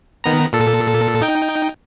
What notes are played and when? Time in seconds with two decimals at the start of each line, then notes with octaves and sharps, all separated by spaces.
0.24 D#3 B3 A#5
0.53 A#2 A4
1.22 D#4 G5